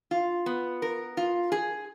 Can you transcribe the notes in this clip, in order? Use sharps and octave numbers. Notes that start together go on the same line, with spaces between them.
F4
B3
A#4
F4
G#4